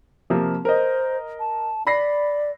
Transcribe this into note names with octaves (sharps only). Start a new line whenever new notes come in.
C3 F3 A#3
A#4 C5 D#5
A5
D5 B5 A#6 C7